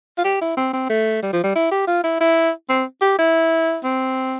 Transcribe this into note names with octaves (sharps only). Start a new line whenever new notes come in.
F4
G4
E4
C4
C4
A3
G3
F3
G3
E4
G4
F4
E4
E4
C4
G4
E4
C4